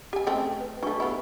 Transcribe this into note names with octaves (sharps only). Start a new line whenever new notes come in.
G4 G#5
C#3 A3 C4 D#5
B4
F#3 A3 D4 C#6
B3 E4 G4 B4 F#5